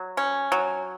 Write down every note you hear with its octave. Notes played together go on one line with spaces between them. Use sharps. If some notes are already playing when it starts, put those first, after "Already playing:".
Already playing: F#3
C#4
F#3